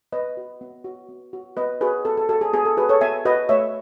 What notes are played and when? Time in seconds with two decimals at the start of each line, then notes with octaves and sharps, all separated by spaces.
0.12 B3 B4 D#5
0.37 F#4
0.61 B3
0.85 F#4
1.09 B3
1.33 F#4
1.57 B3 B4 D#5
1.81 F#4 G#4 B4
2.05 B3 A4
2.17 A4
2.29 F#4 A4
2.41 G#4
2.53 B3 G#4
2.65 A4
2.77 F#4 G#4 B4
2.89 A4 C#5
3.01 B3 E5 G#5
3.25 F#4 B4 D#5
3.49 A3 C#5 E5